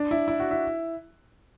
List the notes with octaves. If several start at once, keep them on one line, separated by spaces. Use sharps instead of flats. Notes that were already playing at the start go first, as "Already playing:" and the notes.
Already playing: D4
E4
E4
F#4
E4